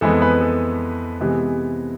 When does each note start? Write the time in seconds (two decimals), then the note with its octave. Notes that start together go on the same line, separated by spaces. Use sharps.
0.01 F2 E3 G#3 B3 A4
0.22 B4
0.41 A4
1.20 C3 E3 G#3 B3